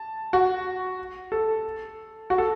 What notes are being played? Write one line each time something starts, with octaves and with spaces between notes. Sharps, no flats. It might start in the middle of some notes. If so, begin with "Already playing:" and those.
Already playing: A5
F#4
A4
F#4
A4